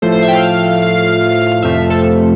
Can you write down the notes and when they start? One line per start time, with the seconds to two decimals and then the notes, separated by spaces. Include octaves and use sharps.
0.02 A2 F3 A3 C5
0.12 C5
0.22 E5
0.28 G5
0.33 F5
0.82 F5
1.63 F2 C3 F3 A3 E5
1.90 A4